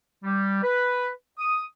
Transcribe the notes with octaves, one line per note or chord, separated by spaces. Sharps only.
G3
B4
D#6